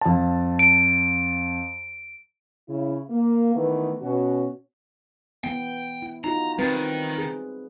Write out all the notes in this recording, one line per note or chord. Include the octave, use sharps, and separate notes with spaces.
F2 A5
D7
C#3 E4
A#3
D#3 E3 A3 B3
B2 C#4 F#4
E3 B3 G5
E4
D#4 F4 F#4 A#5
D#3 G3 C4 B4
G#4